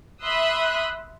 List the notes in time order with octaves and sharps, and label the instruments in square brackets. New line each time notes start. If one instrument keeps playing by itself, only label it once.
[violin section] E5 B5 C6 D#6 E6 F#6